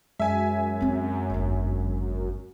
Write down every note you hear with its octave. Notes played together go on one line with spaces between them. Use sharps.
F#2 G#3 E5 G#5
C4 C#4
G1 D#2